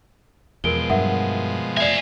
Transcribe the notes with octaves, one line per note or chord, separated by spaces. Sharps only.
E2 B2 F3 G#3 A#4 D7 G7
G2 F#3 A#4 E5 F#5
C5 D5 E5 G#5